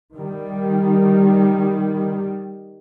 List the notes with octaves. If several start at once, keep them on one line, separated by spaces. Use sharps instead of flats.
D#3 G3